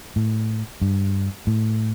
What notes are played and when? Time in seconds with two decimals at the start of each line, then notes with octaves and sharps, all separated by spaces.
0.16 A2
0.82 G2
1.47 A2